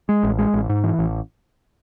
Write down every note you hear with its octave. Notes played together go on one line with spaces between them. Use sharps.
G#3
A1
G#3
A1
G#2
E3
A1